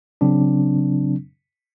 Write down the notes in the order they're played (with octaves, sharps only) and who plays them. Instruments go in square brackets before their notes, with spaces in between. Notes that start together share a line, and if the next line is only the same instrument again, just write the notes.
[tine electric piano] C#3 F#3 C4 D4